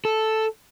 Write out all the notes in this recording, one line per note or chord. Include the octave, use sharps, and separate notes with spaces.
A4